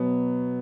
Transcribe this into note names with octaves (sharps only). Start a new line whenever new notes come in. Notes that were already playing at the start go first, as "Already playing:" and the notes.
Already playing: B2 F#3 B3